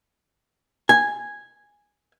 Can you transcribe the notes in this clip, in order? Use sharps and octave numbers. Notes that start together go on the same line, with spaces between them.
G#5